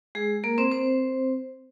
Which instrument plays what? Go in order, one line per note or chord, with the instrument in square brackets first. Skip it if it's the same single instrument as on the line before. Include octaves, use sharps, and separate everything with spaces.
[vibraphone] G#3 G#4
A#3 A#4
C4 C5
C4 C5